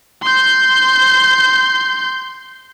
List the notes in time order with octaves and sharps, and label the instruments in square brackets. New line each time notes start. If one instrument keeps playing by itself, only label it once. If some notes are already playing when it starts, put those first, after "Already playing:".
[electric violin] C6 G6